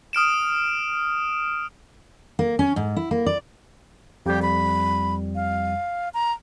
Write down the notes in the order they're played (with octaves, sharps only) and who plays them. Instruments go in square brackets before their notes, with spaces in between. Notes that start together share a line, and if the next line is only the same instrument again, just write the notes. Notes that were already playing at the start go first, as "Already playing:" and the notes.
[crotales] D#6 F6 D7 E7
[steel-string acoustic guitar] A#3
C#4
G#2
E4
A#3
D5
[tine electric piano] F2 G3 [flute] G4
[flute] B5
F5
A#5